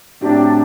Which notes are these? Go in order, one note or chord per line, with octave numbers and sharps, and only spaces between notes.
A2 F#3 C4 D4 G4